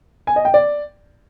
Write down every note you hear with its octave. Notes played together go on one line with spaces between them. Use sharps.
G#5
D#5
G5
D5